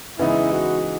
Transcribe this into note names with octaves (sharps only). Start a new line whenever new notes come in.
C#3 E3 G#3 B3 D#4 E4
F#4